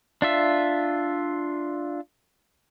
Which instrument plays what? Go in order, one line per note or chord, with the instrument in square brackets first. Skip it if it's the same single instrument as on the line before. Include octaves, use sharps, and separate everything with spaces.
[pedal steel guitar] D4 F4 E5